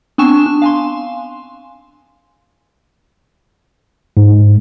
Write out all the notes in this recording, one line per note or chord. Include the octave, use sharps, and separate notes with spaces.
B3 C4 D4 G#5 C#6 E7
D4
F5 G#5 C6
G#2